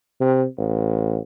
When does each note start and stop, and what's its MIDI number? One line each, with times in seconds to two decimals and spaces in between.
0.20 0.45 48
0.58 1.18 33